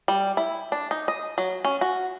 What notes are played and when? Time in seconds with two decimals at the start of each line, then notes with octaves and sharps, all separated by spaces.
0.08 G3
0.37 E4
0.72 D4
0.91 D#4
1.08 D#5
1.38 F#3
1.65 C#4
1.81 F#4